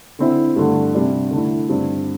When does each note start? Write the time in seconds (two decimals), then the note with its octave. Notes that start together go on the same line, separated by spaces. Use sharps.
0.19 D3 C4 E4
0.56 G2 D3 A3
0.95 C3 G3 D4
1.31 D3 A3 E4
1.68 G2 D3 C4